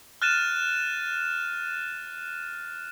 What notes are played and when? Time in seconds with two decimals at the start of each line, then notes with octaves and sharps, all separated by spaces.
0.22 F6 F#6 A6 D#7 E7